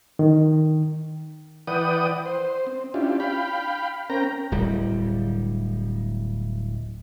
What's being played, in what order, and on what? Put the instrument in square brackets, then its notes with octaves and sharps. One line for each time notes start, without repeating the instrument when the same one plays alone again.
[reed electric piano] D#3
[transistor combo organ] E3 B4 D5 F#5 G5 D#6
C5
C4
C#4 D4 E4 F4 G4
F5 G5 B5
C4 C#4 A#4 G5 A#5
[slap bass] D1 G3